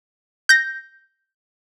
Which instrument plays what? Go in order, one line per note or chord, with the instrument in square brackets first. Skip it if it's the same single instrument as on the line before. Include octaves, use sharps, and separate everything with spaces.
[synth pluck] G6 A#6